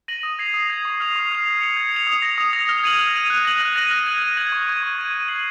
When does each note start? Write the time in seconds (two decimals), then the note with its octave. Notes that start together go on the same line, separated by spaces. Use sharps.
0.08 A#6 D#7 F#7
0.23 D#6
0.39 G#6 C7 F7
0.54 D#6
0.70 G#6 C7 F7
0.85 C#6
1.00 F6 C7 F7
1.15 C#6
1.31 F6 C7 F7
1.46 G#6
1.61 C#7 F7
1.77 G#6
1.92 C#7 F7
2.07 D#6
2.22 A#6 F7
2.38 D#6
2.53 A#6 F7
2.69 F6
2.84 G#6 D#7 F#7
2.99 F6
3.14 G#6 D#7 F#7
3.30 F#6
3.45 A#6 D#7 F#7
3.61 F#6
3.76 A#6 D#7 F#7
3.91 F6
4.06 G#6 D#7 F#7
4.22 F6
4.37 G#6 D#7 F#7
4.52 C#6
4.67 G#6 D#7
4.82 C#6
4.98 G#6 D#7
5.14 G#6
5.28 C7 D#7 F#7